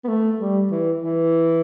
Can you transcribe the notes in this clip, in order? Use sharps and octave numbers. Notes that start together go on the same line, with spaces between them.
B3
A3
G3
E3
E3